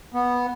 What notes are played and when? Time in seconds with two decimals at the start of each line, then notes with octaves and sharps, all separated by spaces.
0.14 B3